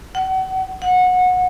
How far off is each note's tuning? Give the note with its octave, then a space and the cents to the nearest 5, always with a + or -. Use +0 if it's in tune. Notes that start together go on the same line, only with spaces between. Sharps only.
F#5 +35
F#5 -20